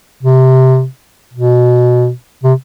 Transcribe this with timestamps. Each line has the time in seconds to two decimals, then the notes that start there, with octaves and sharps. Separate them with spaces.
0.23 C3
1.33 B2
2.43 C3